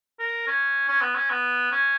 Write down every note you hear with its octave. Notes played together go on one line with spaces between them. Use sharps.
A#4
C#4
C#4
B3
C#4
B3
C#4